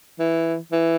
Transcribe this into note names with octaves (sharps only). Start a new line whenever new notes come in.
E3
E3